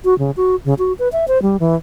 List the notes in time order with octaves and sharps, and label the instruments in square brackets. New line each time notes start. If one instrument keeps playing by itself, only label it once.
[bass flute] F#4
C#3
F#4
C#3
F#4
B4
E5
C5
G3
E3